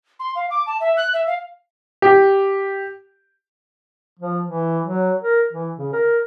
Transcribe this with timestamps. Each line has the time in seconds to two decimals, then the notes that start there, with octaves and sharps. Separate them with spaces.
0.19 C6
0.35 F5
0.50 D6
0.66 A5
0.80 E5
0.97 F#6
1.13 E5
1.26 F5
2.02 G4
4.20 F3
4.44 E3
4.84 F#3
5.22 A#4
5.53 E3
5.78 C#3
5.93 A#4